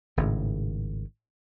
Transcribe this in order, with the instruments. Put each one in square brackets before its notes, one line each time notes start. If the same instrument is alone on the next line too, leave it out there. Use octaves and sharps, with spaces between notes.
[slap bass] G#1 A2 C#3